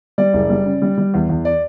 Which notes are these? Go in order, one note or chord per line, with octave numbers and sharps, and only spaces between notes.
G3 D5
F#1
G3
C#3
G3
G3
E2
E2
D5